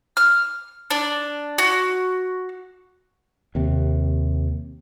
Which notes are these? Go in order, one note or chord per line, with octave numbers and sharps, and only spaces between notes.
F6
D4
F#4
D#2 C3